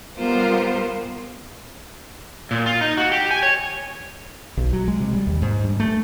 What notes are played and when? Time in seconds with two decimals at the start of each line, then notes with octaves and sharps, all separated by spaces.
0.18 G3 B3 F4 A#4 C5
2.51 A#2
2.66 F4
2.81 D#4
2.97 F#4
3.12 G4
3.31 G#5
3.43 C#5
4.57 B1
4.73 F#3
4.88 G#3
5.00 C3
5.13 G3
5.27 D#2
5.42 G#2
5.64 G2
5.80 A3